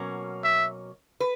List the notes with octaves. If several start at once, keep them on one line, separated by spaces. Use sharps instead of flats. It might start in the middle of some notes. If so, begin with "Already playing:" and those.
Already playing: B2 F#3 A#3 C#4
E5
B4